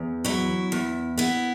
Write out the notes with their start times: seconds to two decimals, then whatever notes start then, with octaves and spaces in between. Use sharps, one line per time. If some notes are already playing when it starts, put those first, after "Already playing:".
Already playing: E2
0.25 F#3 E4
0.72 E2
1.18 B3 E4